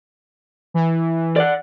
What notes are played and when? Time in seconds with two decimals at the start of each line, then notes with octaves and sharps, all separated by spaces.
0.74 E3
1.36 D5 F#5